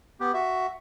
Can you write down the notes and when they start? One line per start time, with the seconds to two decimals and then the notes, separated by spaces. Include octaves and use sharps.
0.20 B3 G4
0.34 F#4 E5